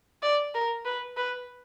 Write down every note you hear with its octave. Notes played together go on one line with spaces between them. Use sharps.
D5
A#4
B4
B4